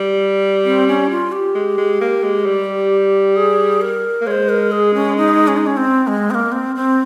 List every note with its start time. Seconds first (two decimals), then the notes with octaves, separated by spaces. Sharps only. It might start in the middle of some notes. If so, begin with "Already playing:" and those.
Already playing: G3
0.65 C4
0.88 C#4
1.10 F4
1.32 G4
1.55 G#3
1.78 G#3
2.01 A#3
2.23 G#3
2.46 G3
3.36 G#4
3.81 A#4
4.21 A#3
4.27 G#3 C#5
4.31 C5
4.49 A#4
4.71 G#4
4.94 C#4
5.17 D#4
5.48 C#4
5.57 D#4
5.66 C#4
5.77 C4
6.07 G#3
6.31 C4
6.34 A#3
6.52 C4
6.76 C4